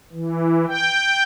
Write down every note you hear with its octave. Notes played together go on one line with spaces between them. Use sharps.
E3
G5